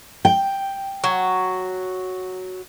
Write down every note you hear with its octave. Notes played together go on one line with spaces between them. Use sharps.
G5
F#3